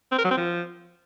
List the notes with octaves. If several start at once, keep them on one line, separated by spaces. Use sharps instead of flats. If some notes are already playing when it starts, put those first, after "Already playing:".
C4
A#4
F#3
C4
F3